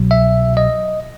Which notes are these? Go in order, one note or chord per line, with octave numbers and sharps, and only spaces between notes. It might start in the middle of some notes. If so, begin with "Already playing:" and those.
Already playing: C2 B2 F#3
E5
D#5